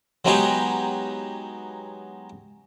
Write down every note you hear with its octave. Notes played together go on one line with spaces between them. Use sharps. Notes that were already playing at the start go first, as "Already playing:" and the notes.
F#3 G#3 B3 D#4 G4 G#4